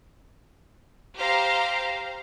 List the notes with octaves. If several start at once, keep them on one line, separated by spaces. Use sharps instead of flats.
G4 C5 F5 A#5